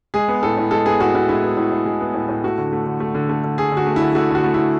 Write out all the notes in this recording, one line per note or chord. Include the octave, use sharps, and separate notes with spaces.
G#3 G#4
B3
A2 A4
A2
G#3 A4
B3 G#4
A2 F#4
A2 F#4
G#3 E4
B3
A2
A2
G#3
B3
A2
A2
A3 F#4
D3
A3
D3
A3
D3
A3
D3
A3 G#4
D3 F#4
A3
E4
D3
A3 F#4
D3 F#4
A3
D3 E4